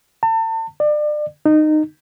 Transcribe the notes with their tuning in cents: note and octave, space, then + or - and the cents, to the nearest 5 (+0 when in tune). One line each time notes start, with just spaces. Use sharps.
A5 +40
D5 +30
D#4 -20